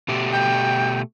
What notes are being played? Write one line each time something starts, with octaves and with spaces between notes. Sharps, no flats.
B2 A3 G4
G5